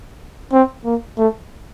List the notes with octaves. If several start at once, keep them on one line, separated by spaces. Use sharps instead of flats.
C4
A#3
A3